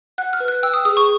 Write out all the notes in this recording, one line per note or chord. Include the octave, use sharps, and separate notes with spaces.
F#5 F#6
F6
B4
F#6
G5 E6
D#6
G#4 D#6
C#6